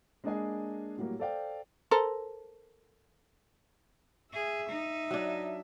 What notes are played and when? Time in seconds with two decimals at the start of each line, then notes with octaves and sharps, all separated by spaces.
0.24 G#3 A#3 D4 G#4 D#5 G#5
0.97 A2 F#3 G3 A#3
1.19 A4 C5 D5 F5 G5
1.91 A4 A#4 C5
4.33 G#4 E5
4.69 D#4
5.11 F#3 D4